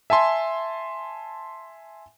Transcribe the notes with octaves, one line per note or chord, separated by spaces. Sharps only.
E5 G#5 A5 C6